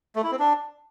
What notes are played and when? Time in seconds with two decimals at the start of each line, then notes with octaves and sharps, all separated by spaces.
0.16 A3
0.23 E4
0.31 C4
0.39 D4